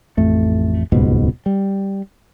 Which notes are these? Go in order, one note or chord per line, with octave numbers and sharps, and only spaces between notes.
A1 F2 A3
D#1 C#2 G#2 B2
G3